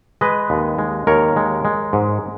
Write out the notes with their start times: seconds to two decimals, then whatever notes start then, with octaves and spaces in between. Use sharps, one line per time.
0.21 G#3 B4 D#5
0.50 D#2
0.78 G#3
1.07 D#2 A#4 C#5
1.36 G#3
1.65 G#3
1.93 G#2